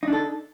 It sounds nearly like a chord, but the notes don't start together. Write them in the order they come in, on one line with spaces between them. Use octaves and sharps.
D#4 D4 A4